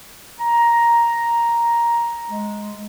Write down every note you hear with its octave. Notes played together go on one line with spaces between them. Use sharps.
A#5
G#3